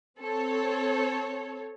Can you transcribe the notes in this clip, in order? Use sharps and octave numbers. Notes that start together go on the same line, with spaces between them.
C4 A4 C#5